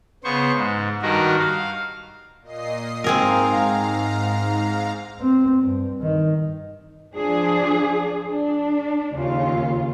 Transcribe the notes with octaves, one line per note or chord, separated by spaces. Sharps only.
C#3 B3 C5 C#6
G#2
G2 D#3 F#4 A#4
F5
A#2 D#5 C7
G#2 C4 G#4 A#4 F5 A#5
C4
G2
D#3
F3 D4 G#4
D4
D#2 C#3 F4